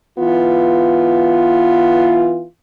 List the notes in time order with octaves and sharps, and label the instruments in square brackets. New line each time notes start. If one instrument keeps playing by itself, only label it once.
[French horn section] E3 B3 F4